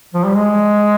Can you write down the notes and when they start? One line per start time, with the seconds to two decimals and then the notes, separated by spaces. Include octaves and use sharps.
0.14 F3
0.25 G3
0.35 G#3